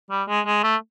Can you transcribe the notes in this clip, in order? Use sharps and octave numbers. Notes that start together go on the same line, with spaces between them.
G3
G#3
G#3
A3